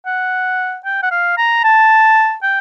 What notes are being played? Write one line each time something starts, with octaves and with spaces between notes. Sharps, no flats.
F#5
G5
F#5
F5
A#5
A5
G5